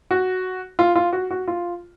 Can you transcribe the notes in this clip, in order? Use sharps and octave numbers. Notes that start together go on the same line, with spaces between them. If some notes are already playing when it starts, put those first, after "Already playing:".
F#4
F4
F4
F#4
F#4
F4